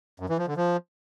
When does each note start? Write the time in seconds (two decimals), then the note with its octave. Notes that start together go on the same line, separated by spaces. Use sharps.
0.20 F#2
0.29 E3
0.38 F3
0.48 D3
0.57 F3